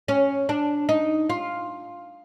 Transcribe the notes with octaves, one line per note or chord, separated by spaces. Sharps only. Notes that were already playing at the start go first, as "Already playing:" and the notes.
C#4
D4
D#4
F4